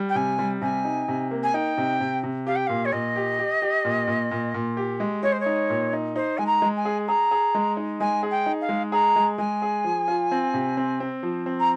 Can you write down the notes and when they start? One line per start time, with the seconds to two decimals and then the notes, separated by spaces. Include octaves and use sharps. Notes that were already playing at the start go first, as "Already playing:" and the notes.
Already playing: G3
0.09 G5
0.15 C3 G#5
0.39 G3
0.62 C3 G#5
0.85 D#4
1.08 C3
1.31 A#3
1.43 G#5
1.54 D#4 G5
1.78 C3
2.00 C3
2.23 C3
2.47 G4 F5
2.56 G5
2.67 A#2 F5
2.85 C#5
2.92 A#2 D#5
3.16 G4
3.39 G4
3.62 G4
3.85 A#2
4.07 A#2
4.31 A#2
4.54 A#2
4.77 G4
5.00 G#3
5.23 G#3 C#5
5.32 C5
5.40 C#5
5.46 D#4
5.70 A#2
5.93 D#4
6.16 D#4 C5
6.38 G#3 G#5
6.47 A#5
6.62 G#3
6.77 G#5
6.85 G#4
7.08 G#4 A#5
7.31 G#4
7.55 G#3
7.77 D#4
8.00 G#3 G#5
8.23 G#4
8.31 G5
8.46 D#4
8.61 F5
8.69 G#3
8.92 G#4 A#5
9.16 G#3
9.38 G#3 G#5
9.62 G#4
9.84 F3
10.08 F4
10.32 C4
10.54 C3
10.77 C4
11.00 C4
11.23 F3
11.46 C4
11.60 A#5